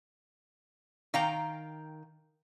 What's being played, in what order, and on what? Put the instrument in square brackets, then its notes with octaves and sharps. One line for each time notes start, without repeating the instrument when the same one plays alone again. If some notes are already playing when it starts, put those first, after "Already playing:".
[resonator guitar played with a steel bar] D#3 F5 G5 A#5